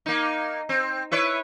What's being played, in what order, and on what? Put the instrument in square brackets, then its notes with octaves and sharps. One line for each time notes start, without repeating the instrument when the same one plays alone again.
[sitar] A#3 D#4
C4
E4 B4 C#5